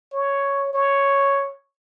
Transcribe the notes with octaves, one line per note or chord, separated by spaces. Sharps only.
C#5
C#5